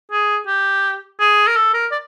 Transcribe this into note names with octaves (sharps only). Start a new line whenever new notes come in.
G#4
G4
G#4
A#4
A4
A#4
D5